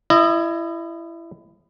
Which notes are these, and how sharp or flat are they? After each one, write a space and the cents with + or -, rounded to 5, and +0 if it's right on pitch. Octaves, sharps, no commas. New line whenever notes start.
E4 +20 D#5 -20